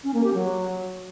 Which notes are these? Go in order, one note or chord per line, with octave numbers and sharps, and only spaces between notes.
C#4
A#3
G4
F#3